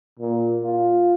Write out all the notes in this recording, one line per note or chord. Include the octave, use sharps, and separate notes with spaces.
A#2
F4